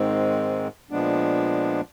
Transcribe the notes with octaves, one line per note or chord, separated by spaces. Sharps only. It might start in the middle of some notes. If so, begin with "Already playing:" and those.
Already playing: G#2 D#3 G#3 C4
A#2 F3 G#3 B3 D4